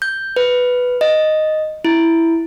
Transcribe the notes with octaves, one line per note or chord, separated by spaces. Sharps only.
G6
B4
D#5
E4